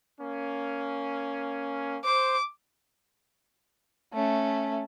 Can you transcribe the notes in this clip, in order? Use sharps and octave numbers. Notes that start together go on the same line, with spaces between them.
A#3 C#4
C5 D6
A3 C#4